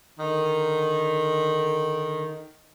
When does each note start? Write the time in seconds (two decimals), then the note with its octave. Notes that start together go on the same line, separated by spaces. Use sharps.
0.19 D3 D#3